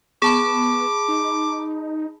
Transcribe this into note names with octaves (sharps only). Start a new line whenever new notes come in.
B3 G#4 A5 B5 D6
D#4